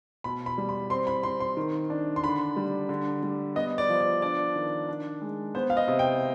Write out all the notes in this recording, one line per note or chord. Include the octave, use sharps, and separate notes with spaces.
B2 B5
B5
G3
B5
C4 C6
B5
C4 C6
C6
D#3
D4
C6
D3 B5
G3
D3
G3
B3 D#5
D5
F3
D5
D4 D5
D#3
D4
G#3
B3 C5
F5
D#5
C3
G5